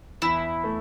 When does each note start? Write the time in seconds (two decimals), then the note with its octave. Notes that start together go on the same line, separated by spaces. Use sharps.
0.22 E2 E4
0.64 A3